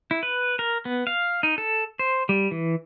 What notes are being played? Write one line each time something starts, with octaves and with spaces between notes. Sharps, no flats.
E4
B4
A#4
B3
F5
D#4
A4
C5
G3
E3